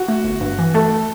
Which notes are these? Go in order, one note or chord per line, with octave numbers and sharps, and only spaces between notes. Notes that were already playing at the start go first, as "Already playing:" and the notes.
Already playing: F#4
A3
G1
G2
E3
A3 A4